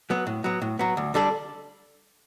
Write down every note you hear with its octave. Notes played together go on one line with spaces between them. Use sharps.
F#3 B3
A2
F#3 B3
A2
F#3 B3
D2
D3 G3 D4 A4